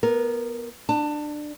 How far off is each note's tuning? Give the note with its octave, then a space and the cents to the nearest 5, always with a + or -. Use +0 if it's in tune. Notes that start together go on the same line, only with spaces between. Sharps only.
B3 -15 A#4 +0
D4 +20 A5 +25